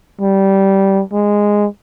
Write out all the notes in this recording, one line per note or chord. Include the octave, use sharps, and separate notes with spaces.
G3
G#3